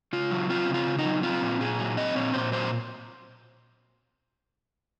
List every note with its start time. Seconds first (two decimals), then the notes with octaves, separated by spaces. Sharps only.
0.13 C#3 F4
0.31 F#3
0.50 C4 F4
0.69 C#3
0.74 F4
0.87 C#3
0.99 D#4
1.05 F#3
1.23 C4 F4
1.42 A#2
1.60 A#2 G#4
1.79 F#3
1.97 C4 D#5
2.16 A#2 C#5
2.34 A#2 C5
2.52 F#3 C5